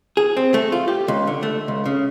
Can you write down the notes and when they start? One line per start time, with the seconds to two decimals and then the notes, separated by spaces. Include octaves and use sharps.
0.17 G#4
0.37 C4
0.54 A3
0.72 F4
0.88 G4
1.08 C#2
1.27 D3
1.43 A3
1.68 C#2
1.86 C#3